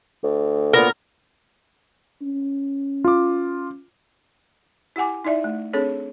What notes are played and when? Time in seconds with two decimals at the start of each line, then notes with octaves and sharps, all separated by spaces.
0.23 D2
0.73 A#2 B3 A#4
2.22 C#4
3.04 F4 D6
4.96 E4 G4 F#5 G#5 D6
5.24 D#4 E4 D5 E5
5.44 A3
5.73 C4 D4 G#4 A4 C#5